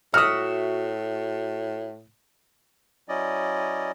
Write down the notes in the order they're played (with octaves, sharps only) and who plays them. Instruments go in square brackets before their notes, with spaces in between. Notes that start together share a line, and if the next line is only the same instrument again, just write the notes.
[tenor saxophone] A2 [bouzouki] F#4 E5 [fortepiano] D#6 F6
[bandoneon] F#3 C#4 E4 D5 D#5